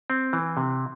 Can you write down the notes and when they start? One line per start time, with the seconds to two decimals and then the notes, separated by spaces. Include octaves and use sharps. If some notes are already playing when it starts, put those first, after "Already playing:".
0.10 C4
0.33 E3
0.57 C3